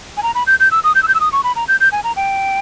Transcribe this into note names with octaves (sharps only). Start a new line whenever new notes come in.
G#5
A#5
B5
G6
G6
E6
D#6
G6
E6
G6
E6
D#6
C#6
B5
A#5
G6
G6
G#5
A#5
G5